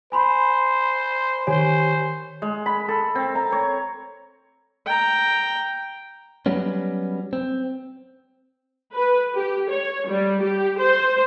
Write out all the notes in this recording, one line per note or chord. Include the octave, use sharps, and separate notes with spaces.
C5 G#5 B5 C6
D#3 G4 C5 C#5 G#5
G#3
B5
A4
C4
A#5
C#5
G5 A#5
F#3 G3 B3 C#4
C4
B4
G4
C#5
G3
G4
C5